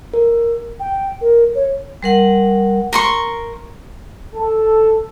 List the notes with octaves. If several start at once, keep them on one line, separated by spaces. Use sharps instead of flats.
A#4
G5
A#4
C#5
G3 A#4 F#5
A#4 C6 C#6
A4